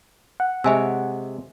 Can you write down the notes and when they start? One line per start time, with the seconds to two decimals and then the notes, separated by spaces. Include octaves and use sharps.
0.40 F#5
0.64 C3 G#3 C#5 E5 G#5 E6